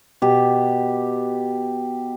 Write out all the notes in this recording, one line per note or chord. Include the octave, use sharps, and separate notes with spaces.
B2 G4